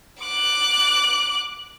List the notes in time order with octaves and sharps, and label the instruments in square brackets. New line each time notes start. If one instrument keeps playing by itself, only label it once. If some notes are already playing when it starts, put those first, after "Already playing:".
[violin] D6 F#6